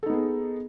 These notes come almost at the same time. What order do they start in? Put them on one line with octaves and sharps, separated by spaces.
A4 D#4 B3 G#4